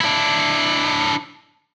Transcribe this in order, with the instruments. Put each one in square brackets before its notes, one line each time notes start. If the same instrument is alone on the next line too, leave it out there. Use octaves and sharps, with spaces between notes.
[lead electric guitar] D4 E4